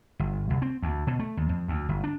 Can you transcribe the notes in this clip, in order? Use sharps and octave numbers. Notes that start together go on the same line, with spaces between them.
G1
C2
C4
D2
B2
A3
D#2
F2
D2
G1
D4